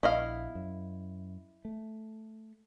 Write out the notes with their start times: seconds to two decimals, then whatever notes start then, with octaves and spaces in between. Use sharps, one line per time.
0.03 A#1 B3 E4 D#5 F5
0.55 F#2
1.65 A3